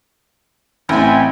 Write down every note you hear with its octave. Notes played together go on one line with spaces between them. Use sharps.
A1 E3 C4 E5 G5 G#5